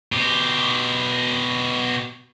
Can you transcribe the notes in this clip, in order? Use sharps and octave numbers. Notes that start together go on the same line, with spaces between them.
B2 G4